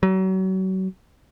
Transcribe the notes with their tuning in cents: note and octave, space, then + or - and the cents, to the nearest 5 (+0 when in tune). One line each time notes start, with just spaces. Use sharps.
F#3 +35